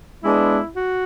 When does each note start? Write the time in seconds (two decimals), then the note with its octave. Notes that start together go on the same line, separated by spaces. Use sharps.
0.24 G#3 B3 D4 E4
0.76 F#4